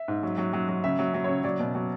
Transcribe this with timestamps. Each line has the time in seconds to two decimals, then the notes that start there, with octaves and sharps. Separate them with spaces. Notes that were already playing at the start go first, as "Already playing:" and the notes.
Already playing: E5
0.08 G#2
0.23 F#3
0.38 F#3
0.53 F#3
0.69 F#3
0.84 C#3 E5
0.99 F#3
1.14 F#3
1.24 C#3 C#5
1.44 F#3 D5
1.60 B2
1.75 F#3